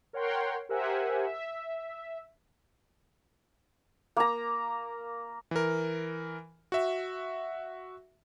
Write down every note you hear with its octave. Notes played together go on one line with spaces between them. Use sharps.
A#4 C#5 F#5 G5 C6
G4 A#4 C5 E5 F#5 G#5
E5
A#3 A#5
E3 A#4
F#4 E5